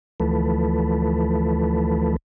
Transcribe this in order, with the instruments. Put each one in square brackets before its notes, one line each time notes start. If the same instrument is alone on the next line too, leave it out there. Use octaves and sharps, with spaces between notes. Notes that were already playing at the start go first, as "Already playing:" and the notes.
[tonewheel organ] D2 E3 F3 A3 A4 B4